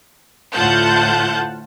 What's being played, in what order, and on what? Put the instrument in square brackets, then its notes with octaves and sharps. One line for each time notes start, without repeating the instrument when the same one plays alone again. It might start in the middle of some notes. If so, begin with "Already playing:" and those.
[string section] D2 A2 F4 F#5 A5 G6